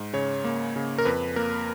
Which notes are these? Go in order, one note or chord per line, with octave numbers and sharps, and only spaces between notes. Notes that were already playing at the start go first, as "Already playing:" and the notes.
Already playing: G#2
C#3 C#5
A#3
C#3
A#4
F2 B4
A#3 A#4